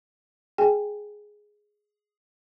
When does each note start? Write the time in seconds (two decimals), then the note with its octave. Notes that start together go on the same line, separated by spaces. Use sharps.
0.58 G#4 G5 G#5